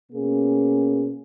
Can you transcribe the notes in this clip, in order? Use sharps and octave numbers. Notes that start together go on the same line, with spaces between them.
B2 A#3 C#4 G#4